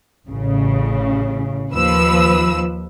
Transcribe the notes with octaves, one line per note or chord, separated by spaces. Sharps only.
A1 C#3
D#2 F3 B4 E6